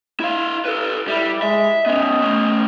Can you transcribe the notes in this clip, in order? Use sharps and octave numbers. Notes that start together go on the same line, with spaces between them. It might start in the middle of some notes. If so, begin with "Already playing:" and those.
E4 F5
A4 B4
G3 E4
G#3 E5
B3 C#4 D#5
A3 C#4